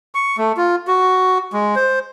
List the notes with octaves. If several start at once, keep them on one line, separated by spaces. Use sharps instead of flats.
C#6
A3
F4
F#4
G#3
C5